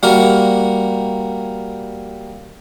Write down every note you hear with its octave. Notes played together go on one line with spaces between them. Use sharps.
G3 A#3 F#4 A#4